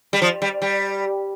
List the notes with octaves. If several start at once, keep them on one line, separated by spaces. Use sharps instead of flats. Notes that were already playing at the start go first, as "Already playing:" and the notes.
G3
F3
G3
G3